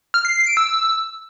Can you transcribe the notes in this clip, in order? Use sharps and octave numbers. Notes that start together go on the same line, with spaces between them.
F6
C7
C7
D7
E6